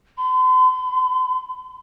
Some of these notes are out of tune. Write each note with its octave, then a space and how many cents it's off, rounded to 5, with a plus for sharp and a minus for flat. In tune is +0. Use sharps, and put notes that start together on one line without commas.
C6 -45